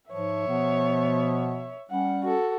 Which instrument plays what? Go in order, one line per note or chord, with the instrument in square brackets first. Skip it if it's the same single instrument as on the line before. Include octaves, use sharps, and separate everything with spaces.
[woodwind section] G#2 F3 [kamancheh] C#5 E5
[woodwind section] B2 F3 B3
[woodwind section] G3 C#4 [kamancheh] F#5
[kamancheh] F#4 A4